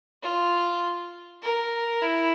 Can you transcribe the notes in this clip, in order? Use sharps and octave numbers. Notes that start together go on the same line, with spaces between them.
F4
A#4
E4